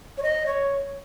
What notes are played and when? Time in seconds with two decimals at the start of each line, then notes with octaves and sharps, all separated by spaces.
0.18 C#5
0.23 D#5
0.46 C#5